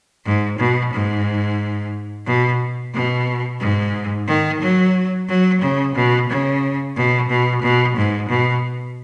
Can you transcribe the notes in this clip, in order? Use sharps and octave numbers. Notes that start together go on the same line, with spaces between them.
G#2
B2
G#2
B2
B2
G#2
D#3
F#3
F#3
C#3
B2
C#3
B2
B2
B2
G#2
B2